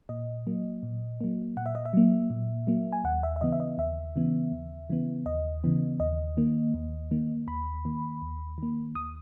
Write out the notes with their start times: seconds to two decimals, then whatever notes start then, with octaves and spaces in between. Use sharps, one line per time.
0.09 A#2 D#5
0.47 F#3 A#3
0.83 A#2
1.21 F#3 A#3
1.57 A#2 F#5
1.66 E5
1.75 D#5
1.85 E5
1.93 F#3 A#3
2.30 A#2
2.67 F#3 A#3
2.92 G#5
3.04 D#2 F#5
3.23 E5
3.36 E5
3.41 C#3 E3 B3 D#5
3.52 E5
3.60 D#5
3.78 D#2 E5
4.16 C#3 E3 B3
4.52 D#2
4.90 C#3 E3 B3
5.26 D#2 D#5
5.64 C#3 E3 B3
6.00 D#2 D#5
6.37 D#3 A#3
6.74 D#2
7.11 D#3 A#3
7.47 D#2 B5
7.85 D#3 A#3
8.22 D#2
8.58 D#3 A#3
8.95 D#2 D#6